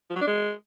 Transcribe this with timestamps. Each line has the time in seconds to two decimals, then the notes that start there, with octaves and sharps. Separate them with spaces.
0.10 F3
0.16 F#3
0.21 D4
0.27 G#3